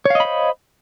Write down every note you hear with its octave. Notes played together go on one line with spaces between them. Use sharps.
C5 C#5 D#5 F5 B5